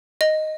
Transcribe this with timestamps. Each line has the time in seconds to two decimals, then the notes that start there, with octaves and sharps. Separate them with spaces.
0.21 D#5